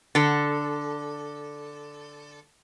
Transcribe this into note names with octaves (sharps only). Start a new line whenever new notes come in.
D3 A4